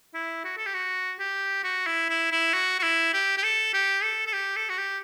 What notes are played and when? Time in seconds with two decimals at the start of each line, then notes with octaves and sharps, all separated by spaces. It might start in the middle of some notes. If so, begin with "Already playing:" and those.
0.14 E4
0.44 F#4
0.57 A4
0.66 G4
0.74 F#4
1.19 G4
1.64 F#4
1.86 E4
2.09 E4
2.32 E4
2.53 F#4
2.79 F#4
2.83 E4
3.13 G4
3.38 G4
3.43 A4
3.74 G4
4.03 A4
4.26 A4
4.33 G4
4.56 A4
4.69 F#4
4.78 G4